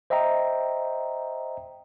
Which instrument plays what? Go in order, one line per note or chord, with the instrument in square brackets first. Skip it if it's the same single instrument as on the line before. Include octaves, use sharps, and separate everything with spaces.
[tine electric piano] C5 D#5 E5 G5 A#5